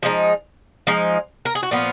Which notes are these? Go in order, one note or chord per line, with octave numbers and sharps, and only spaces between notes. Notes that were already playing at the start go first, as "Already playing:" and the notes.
F3 G#3 D#4
F3 G#3 D#4
A#4
G#4
F#4
A#2 F3 B3 F4